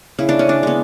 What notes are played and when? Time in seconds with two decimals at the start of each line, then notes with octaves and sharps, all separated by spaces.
0.19 C#3 E4
0.29 D4
0.39 C#4
0.49 D4
0.63 G#3 B3